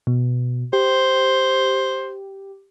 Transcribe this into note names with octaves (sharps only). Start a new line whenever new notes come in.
B2
G4 C5